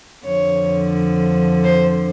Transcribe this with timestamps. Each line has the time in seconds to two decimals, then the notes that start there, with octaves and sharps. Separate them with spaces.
0.25 F2 D3 F3 C#5
1.64 C5